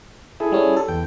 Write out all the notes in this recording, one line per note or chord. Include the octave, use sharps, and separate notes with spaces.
E4 G#4 A4
G3 C#4
A4
E2 G5